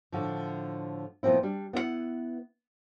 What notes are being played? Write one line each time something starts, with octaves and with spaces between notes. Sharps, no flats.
A2 D3 F3
A#2 F3 B3 C4 E4
G3 D4
B3 E4 G4 F#5